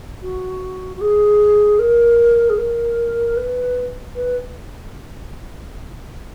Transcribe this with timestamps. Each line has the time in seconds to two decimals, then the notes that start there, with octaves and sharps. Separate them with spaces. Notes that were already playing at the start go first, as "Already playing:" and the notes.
0.22 F#4
0.96 F#4
1.01 G#4
1.79 A#4
2.49 G#4
2.57 A#4
3.37 B4
4.15 B4